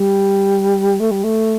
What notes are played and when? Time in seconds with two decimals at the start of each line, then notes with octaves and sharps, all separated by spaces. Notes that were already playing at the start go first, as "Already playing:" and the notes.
Already playing: G3
1.00 A3
1.11 G3
1.24 A3